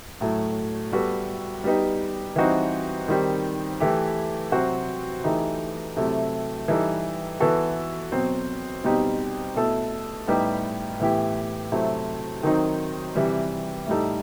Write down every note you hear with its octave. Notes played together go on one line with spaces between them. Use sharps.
A2 F#3 A3
G3 B3 F#4 A4
G3 B3 D#4 G4
E3 G3 C4 D#4 F#4
D#3 G3 C4 D#4
E3 A3 E4 G4
C3 F#3 C4 F#4
E3 A3 D#4 G4
C3 F#3 A3 E4
E3 G3 D#4 A4
E3 B3 F#4 A4
B2 F#3 C4
B2 G3 C4 D#4 G4
B2 A3 E4 A4
A2 G3 B3 D#4 G4
A2 E3 B3 E4 G4
C3 F#3 A3 C4 E4
D#3 F#3 C4 D#4
C3 E3 G3
A2 G3 D#4 A4